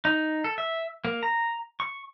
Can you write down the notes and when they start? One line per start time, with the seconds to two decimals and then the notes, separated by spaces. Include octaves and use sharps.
0.05 D#4
0.44 A4
0.58 E5
1.05 A#3
1.23 A#5
1.80 C#6